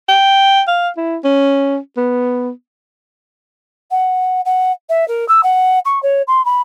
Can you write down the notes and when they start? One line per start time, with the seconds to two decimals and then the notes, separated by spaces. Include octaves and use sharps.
0.09 G5
0.68 F5
0.97 E4
1.24 C#4
1.97 B3
3.91 F#5
4.45 F#5
4.89 E5
5.08 A#4
5.28 E6
5.43 F#5
5.85 C#6
6.02 C#5
6.27 C6
6.45 B5